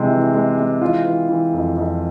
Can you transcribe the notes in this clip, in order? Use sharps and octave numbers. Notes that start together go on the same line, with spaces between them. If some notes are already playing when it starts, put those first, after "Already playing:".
Already playing: C3 E3 G#3
E3
G#3
G#3
E3 F4
E3
E3
F2
F2